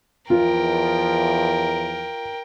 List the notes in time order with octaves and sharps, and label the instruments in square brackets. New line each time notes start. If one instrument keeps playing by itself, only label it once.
[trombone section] E2 F3 [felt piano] F4 [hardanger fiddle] A#4 G5